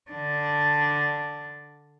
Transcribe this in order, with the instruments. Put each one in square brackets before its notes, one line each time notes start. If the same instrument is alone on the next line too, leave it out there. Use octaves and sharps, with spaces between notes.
[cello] D3 D4